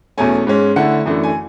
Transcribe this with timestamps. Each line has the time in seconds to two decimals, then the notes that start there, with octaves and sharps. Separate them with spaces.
0.18 E2 B2 A3 C#4 G#5
0.47 G#2 G#3 C#4
0.76 D3 A3 E4 F#5
1.06 F#2 E3 A3 D4
1.23 G#5